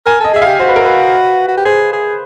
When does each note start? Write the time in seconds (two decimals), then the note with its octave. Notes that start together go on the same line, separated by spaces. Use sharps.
0.06 A#4 G#5
0.20 A4 D#5
0.34 G#4 E5
0.42 G4 F5
0.59 F#4 C5
0.68 B4
0.76 A#4
0.85 B4
1.48 F#4
1.57 G4
1.65 G#4 C5
1.93 G#4